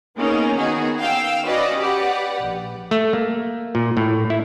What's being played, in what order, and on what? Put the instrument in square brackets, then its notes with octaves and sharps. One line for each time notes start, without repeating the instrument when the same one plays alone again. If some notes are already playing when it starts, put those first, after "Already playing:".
[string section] A#3 B3 C#4 D#4 G#4 A#4
D#3 B3 D#4 F#4 G#4
F5 G5 E6
C#4 F#4 B4 D5 D#5
G4 B4 D5 F#5
A#1
[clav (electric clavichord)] A3
A#3
A#2
A2
E4